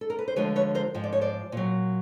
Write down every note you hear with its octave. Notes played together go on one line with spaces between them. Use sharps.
A4
A#4
B4
C5
D2 D3 F3 G#3 B4 C#5
B4 C#5
A#4 C5
G#2 F3 G#3
D5
C#5
C5 D5
A#2 F#3